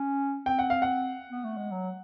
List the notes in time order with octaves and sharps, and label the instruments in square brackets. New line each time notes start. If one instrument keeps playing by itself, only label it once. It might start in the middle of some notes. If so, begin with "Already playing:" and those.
Already playing: [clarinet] C#4
[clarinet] C4 [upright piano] G5
[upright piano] F#5
F5
F#5
[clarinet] B3
A3
G#3
F#3